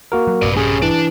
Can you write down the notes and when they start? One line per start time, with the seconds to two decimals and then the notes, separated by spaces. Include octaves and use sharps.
0.12 A#3 F#4 A#4
0.27 F#3
0.42 A#1 G2 C3 B4 D5
0.57 C#4 G4 G#4
0.82 E3 D4